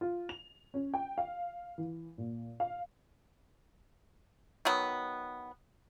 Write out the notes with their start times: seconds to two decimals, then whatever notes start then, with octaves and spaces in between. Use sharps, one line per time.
0.01 F4
0.29 F7
0.74 C#4
0.94 G5
1.18 F5
1.78 E3
2.18 A#2
2.60 F5
4.65 D#3 F#3 B3